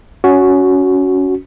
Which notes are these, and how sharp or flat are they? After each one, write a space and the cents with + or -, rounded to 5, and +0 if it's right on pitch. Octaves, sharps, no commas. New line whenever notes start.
C#4 +15 F#4 +0